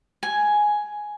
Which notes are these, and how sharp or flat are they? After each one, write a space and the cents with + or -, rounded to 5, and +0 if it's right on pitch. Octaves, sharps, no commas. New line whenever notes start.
G#5 +5